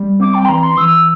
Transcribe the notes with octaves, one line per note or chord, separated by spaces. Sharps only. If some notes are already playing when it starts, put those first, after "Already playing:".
Already playing: G3
C4 D6
G5
C6
E3 A#5
C6
E3 E6